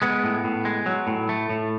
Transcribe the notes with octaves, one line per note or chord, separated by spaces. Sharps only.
G#3 B3
A2
A2
G#3
F#3
A2
A3
A2